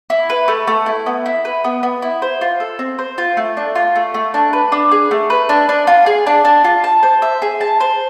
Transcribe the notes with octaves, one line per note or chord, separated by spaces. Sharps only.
E4
B4
A3
A3
E4
B3
E4
B4
B3
B3
E4
C5
F4
A4
C4
C5
F4
A3
D4
F4
A3
A3
D4
B4
D4
G#4
A3
B4
D4
D4
F4
G#4
D4
D4
F4
A5
C5
E5
G#4
A5
C5